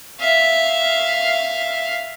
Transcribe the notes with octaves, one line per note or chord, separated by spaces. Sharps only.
E5 F5